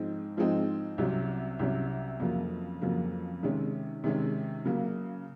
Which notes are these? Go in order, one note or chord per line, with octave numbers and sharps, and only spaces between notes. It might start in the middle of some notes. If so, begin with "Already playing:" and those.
Already playing: G#2 F3 G#3 C4 D#4
G#2 F3 G#3 C4 D#4
C2 C3 F#3 C#4
C2 C3 F#3 C#4
F2 C#3 F#3 A#3
F2 C#3 F#3 A#3
C3 D#3 G#3 C#4
C3 D#3 G#3 C#4
C#3 F#3 A#3